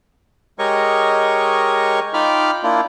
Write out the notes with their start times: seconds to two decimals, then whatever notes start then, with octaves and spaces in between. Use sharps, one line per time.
0.59 G#3 G4 A#4 C#5 D#5 C#6
2.14 D#4 F4 G5 B5 D6 F6
2.63 A#3 D4 E4 F4